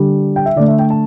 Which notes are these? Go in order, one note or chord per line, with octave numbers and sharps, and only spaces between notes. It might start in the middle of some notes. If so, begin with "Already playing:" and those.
Already playing: D3 G3
G5
E5
D3 A3 D5
E5
G5
A5